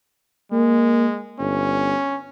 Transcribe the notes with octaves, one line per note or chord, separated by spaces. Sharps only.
G#3 A#3
G1 C#4